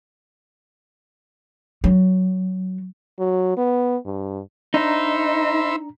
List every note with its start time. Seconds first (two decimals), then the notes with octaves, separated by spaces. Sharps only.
1.84 F#3
3.19 F#3
3.57 B3
4.05 G2
4.74 D4 D#4 C5 E5 A#5 B5